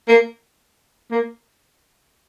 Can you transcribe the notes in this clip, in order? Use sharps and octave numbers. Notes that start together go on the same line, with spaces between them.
A#3
A#3